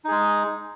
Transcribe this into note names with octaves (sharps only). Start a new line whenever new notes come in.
G#3 D#4 G#4